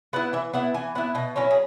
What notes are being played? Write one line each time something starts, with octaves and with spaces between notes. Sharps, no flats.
B3 E4 F#5
E3 E5
B3 E4 F#5
E3 G#5
B3 E4 F#5
B2 D#5
F#3 C#4 E4 C#5
G#4